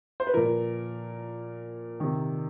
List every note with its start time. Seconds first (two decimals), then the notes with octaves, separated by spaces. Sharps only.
0.20 C5
0.27 B4
0.34 A#2 F3 A#4
2.00 C3 D#3